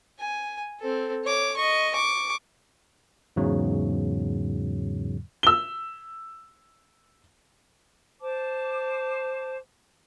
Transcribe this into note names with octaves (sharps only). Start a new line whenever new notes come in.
G#5
C4 A4
C#5 D6
D#5 C#6
C#6 D6
E2 G#2 C#3 F#3
E6 G7
C5 A5 D6